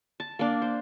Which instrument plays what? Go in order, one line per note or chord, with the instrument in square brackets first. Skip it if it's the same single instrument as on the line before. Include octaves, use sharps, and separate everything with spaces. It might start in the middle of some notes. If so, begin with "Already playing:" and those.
[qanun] A5
A#3 D4
C5